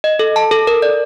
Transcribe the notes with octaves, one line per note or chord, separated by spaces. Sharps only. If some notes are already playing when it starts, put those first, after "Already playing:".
D#5
A4
A5
A4
A#4
D5